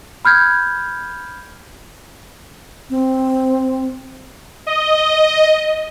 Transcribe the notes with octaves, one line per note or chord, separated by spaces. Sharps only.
B5 F6 G6 G#6
C4
D#5